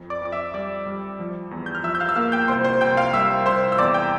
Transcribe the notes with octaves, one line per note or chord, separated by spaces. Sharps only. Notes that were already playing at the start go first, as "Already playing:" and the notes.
Already playing: F2
D5 D6
F2 D6
E5 E6
G3 D5 D6
G3
F3
E2
G6
F6
F3 E5 E6
G6
F5 F6
E6
A#3 F5 F6
G5 G6
C2 C5 C6
C5 C6
C2 G5 G6
F5 F6
G3 E5 E6
C2 C5 C6
E6
E2 D5 D6
G5 G6